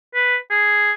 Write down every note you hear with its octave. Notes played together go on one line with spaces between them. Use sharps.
B4
G#4